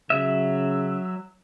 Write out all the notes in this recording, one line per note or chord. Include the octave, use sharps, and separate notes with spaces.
C#3 F#3 E5